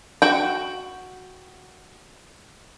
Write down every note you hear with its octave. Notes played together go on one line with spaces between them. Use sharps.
F#4 G5